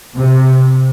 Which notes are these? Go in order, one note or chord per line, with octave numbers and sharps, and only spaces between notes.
C3